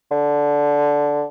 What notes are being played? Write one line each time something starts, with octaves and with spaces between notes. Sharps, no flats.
D3